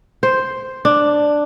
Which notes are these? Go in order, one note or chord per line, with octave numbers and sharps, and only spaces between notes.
C5
D4